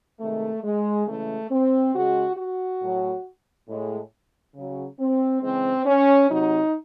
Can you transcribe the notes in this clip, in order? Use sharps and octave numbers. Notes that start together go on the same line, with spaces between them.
C3 D#3 G#3 A3
G#3
C#3 E3 G#3 A3
C4
C#3 G#3 F#4
F#4
A2 F#3
A2 G#3
C#3 F#3
C4
C#3 E3 G#3 C4
C#4
C3 F#3 D#4